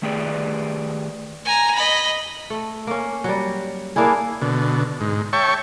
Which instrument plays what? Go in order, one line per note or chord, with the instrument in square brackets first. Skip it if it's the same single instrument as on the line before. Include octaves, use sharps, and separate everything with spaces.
[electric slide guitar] D#3 A3 G4 G#4 B4 D5
[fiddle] G#5 A#5
D#5 B5
[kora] A3
A#3 C#4
F#3 G3
A#3 D4 E4 G#4
[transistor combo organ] B2 D3
G#2
C#5 E5 G5 A5 C#6